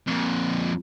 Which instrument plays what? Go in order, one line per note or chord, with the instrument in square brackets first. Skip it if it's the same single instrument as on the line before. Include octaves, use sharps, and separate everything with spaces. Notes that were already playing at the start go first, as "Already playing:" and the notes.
[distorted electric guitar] F2 A#2